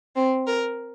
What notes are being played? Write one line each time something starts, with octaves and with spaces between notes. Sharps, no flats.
C4
A#4